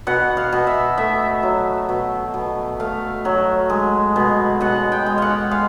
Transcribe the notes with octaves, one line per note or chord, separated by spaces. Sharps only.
B2 F#5
F5
B2
E5
A3 E5
F#3
B2
B2
A3 F5
F#3
G#3
B2
B2 F#5
G5
G#3
F5 F#5
G#3 F5